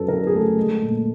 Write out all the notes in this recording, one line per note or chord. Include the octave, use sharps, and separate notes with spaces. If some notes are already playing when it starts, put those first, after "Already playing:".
Already playing: F#2 F#3 A4 B4
D3 A#4
A4
G#4
A3 A4
G#3
A#2